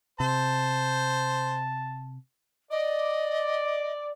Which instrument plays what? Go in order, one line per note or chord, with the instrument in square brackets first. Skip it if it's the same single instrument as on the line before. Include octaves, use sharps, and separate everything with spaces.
[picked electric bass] C3 [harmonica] C5 [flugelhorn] A5
[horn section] D5 [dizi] D#5